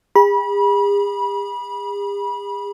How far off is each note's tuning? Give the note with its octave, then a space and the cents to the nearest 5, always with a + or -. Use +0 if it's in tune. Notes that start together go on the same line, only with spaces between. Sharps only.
G#4 -45 B5 -30